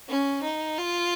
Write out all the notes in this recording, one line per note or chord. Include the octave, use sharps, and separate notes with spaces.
C#4
D#4
F4